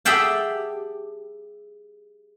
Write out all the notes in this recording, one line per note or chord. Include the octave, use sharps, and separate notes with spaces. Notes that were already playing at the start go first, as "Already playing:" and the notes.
G4 G#4 E5 F#5 G5 A5